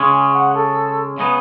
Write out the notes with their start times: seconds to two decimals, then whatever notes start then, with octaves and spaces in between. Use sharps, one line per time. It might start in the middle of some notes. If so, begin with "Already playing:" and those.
Already playing: C#3 G#3 C#4
0.12 G#5
0.34 F#5
0.54 A4
1.18 C#3 G#3 B3 D#4